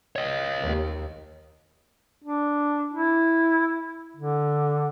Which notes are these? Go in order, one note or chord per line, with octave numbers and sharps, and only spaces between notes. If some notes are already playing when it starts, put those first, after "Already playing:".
C#5 D#5
D#2
D4
E4
D3